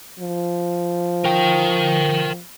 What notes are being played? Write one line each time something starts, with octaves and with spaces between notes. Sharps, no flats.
F3
A#4 G5